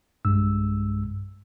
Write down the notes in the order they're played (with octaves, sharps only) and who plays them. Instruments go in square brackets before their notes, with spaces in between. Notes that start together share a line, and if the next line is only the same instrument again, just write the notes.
[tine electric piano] B1 G2 G#3 E6